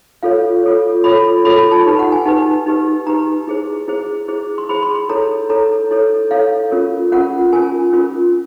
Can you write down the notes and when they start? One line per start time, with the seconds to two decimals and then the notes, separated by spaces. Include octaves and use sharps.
0.23 F4 A4 C#5 F5
0.64 F4 A4 C#5
1.04 F4 A4 C#5 B5
1.45 F4 A4 C#5 B5
1.59 B5
1.72 A5
1.86 D#4 G4 B4
1.99 F#5
2.12 G#5
2.25 D#4 G4 B4 A5
2.66 D#4 G4 B4
3.07 D#4 G4 B4 A#5
3.47 E4 G#4 C5
3.88 E4 G#4 C5
4.28 E4 G#4 C5
4.58 C6
4.69 E4 G#4 C5 B5
4.83 C6
4.95 C6
5.09 E4 A4 C#5 A#5
5.50 E4 A4 C#5 A#5
5.91 E4 A4 C#5
6.31 E4 A4 C#5 F5
6.71 C#4 F4 A#4
7.12 C#4 F4 A#4 F#5
7.52 C#4 F4 A#4 G#5
7.93 C#4 F4 A#4